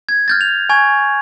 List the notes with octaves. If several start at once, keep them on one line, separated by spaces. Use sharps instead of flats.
G#6
F6 G6 A6
F7
G#5 C#6 G#6